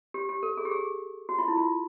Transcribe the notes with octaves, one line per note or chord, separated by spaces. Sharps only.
G4
G4
A4
G#4
G4
G#4
F#4
F4
E4
F4